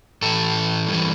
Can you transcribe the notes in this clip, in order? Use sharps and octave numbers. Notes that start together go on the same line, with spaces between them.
A2 E3 A4
G2 E3